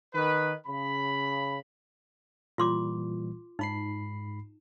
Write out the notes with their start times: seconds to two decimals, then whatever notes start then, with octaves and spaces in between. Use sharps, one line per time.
0.14 D#3 B4
0.67 C#3 B5
2.58 A#2 E3 G3 F4 C6 D6
3.59 G#2 D#4 B5 C7